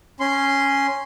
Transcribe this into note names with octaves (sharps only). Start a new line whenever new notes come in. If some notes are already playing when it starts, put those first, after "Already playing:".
C#4 C6